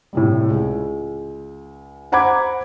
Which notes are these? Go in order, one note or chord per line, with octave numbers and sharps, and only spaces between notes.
A2 C3 G3
C#2
C5 F#5 A#5 B5 D6 G#6